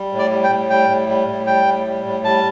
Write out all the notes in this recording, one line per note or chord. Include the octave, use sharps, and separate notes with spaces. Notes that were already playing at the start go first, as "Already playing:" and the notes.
Already playing: G3
A2
D5
G3
G5
A2
G3 G5
A2
G3
A2
G3 G5
A2
G3
A2
G3 A5